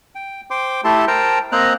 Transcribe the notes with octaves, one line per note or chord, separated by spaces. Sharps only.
G5
C5 G5 C6 D6
A3 E4 G4 A4 A5 C6
A#4 C5 G5 A5 A#5
A#3 C4 C5 D#5 A#5 F#6